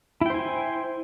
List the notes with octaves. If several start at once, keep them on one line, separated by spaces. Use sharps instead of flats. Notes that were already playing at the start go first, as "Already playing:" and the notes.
E4 C5 G5 G#5